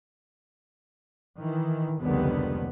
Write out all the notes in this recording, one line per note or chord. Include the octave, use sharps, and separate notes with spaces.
D#3 E3
F1 C#2 D3 D#3 G3 B3